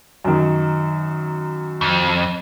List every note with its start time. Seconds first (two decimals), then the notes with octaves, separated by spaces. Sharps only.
0.25 F#2 D#3
1.81 F2